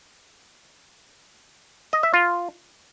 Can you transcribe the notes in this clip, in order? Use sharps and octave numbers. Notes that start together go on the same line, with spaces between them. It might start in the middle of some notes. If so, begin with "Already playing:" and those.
D#5
E5
F4